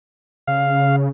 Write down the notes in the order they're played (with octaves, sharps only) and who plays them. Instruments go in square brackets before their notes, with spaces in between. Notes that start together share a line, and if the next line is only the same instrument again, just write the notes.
[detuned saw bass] C#3 [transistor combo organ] F5